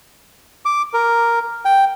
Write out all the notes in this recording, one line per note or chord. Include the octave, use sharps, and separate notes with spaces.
D6
A#4
G5